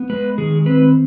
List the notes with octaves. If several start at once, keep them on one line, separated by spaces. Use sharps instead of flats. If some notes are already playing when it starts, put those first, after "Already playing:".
Already playing: B3
G#3 B4
D#3 G#4
C4 B4